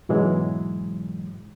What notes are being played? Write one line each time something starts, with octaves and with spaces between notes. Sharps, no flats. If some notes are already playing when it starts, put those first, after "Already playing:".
G#2 B2 E3 F#3 G#3